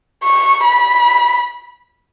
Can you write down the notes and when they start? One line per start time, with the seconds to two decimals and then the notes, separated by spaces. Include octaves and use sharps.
0.23 C#6
0.64 B5